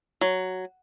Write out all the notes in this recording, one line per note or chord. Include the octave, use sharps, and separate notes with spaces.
F#3